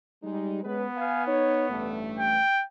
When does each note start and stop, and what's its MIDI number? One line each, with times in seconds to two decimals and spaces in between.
0.23 0.63 55
0.23 0.63 56
0.23 0.63 63
0.64 0.85 56
0.64 2.10 59
0.64 0.85 61
0.64 0.85 71
0.97 1.25 71
0.97 1.25 77
0.97 1.25 80
1.27 1.67 63
1.27 1.67 73
1.70 2.40 33
1.70 2.40 43
1.70 2.40 57
2.19 2.63 79